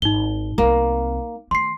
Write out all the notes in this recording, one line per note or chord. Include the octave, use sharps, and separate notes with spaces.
G#1 D#4 G7
C2 A#3 C4
D#3 A3 C6 C7